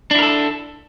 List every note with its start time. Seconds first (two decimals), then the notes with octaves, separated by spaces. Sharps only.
0.11 D4
0.15 E4
0.19 A#4
0.23 A4